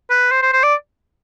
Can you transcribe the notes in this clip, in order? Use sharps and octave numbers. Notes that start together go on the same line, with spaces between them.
B4
C5
C5
C5
D5